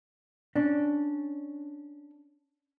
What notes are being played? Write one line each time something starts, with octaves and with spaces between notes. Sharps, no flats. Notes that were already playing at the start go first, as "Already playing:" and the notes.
C#4 D4